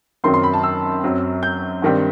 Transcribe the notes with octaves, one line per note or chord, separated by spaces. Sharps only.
F#2 D#3 F#3 C4 C6
C6
B5
A5
E6
F#2 F#3 C4
G6
G2 D#3 G3 C4